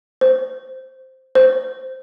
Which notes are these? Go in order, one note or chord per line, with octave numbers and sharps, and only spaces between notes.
C5
C5